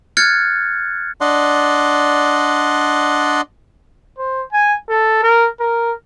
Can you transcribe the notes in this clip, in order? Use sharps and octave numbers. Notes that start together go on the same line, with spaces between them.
F6 F#6 G#6 A6 C#7
D4 D5 D#5 F#5 C6
C5
G#5
A4
A#4
A#4